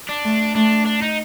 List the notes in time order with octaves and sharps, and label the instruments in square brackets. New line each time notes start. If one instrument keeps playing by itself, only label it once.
[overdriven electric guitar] D4
[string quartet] A3
[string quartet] A3 [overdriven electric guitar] D4
[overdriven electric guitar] D4
D#4